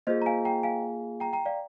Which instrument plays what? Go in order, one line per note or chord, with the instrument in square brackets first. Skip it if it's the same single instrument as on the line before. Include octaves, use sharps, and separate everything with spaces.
[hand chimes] A#3 F4 G#4 [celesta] C5 D#5
[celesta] A#5
F5 G#5
G5 A#5
F5 G#5
G5 A#5
G5 A#5
D5 F5